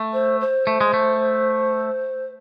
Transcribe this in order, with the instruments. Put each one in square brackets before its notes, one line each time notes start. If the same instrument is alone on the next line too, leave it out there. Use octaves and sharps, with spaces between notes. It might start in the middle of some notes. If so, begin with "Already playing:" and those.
Already playing: [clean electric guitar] A3
[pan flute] C5
C5
[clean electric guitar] A3
G#3
A3